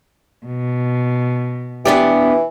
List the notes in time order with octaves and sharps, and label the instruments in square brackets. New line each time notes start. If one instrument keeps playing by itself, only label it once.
[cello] B2
[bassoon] E3 [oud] B3 D4 G4